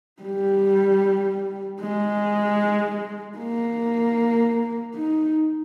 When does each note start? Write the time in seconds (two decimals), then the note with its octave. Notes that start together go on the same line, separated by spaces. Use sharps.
0.22 G3
1.80 G#3
3.38 A#3
4.95 D#4